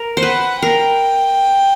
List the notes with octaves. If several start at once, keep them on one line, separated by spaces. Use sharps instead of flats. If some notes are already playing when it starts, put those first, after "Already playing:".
Already playing: A#4
C5
B4 F#5
A#4 G5